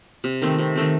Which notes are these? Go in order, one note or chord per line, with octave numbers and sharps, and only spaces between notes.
C3
D#3 A3 C4
C3
D#3 A3 C4